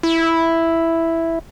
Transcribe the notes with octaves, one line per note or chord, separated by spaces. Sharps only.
E4